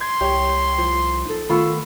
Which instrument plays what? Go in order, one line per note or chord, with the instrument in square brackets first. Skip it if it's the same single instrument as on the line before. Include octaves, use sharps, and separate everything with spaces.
[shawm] C6 [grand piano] G#6
[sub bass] C2 [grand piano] G4 C#5
[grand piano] F3
[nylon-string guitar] D#4 A4
[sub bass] D#3 [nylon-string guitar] A3 B3 F4 [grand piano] B5 C#6 E6